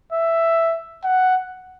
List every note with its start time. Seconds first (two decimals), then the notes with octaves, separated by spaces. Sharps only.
0.13 E5
1.04 F#5